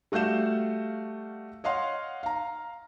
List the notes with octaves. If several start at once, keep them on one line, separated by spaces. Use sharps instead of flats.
G3 A3 F#4 F5 G6 E7
C#5 D#5 F5 F#5 C6
F5 A#5